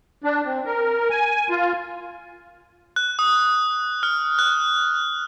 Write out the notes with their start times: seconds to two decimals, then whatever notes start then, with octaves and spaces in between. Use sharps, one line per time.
0.24 D4
0.46 C4
0.66 A#4
1.10 G#5
1.49 F4
2.96 F#6
3.19 D#6
4.03 F6
4.39 F#6